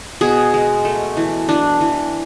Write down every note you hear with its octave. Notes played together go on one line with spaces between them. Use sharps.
B2 G#4
G#3
A3
E3
E3 D4
E3